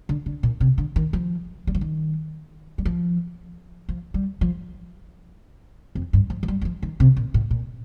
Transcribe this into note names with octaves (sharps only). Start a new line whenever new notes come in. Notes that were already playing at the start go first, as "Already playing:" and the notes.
D3
D3
A#2
C3
D3
D#3
F3
G3
F3
D#3
G3
F3
F3
G3
F3
F2
G2
F3
F3
G3
G3
F3
D#3
C3
A#2
A2
A#2